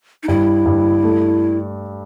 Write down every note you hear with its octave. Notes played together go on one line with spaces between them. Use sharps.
D#4
G2 E4
G2
A3